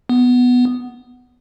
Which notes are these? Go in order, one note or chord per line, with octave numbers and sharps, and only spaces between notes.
B3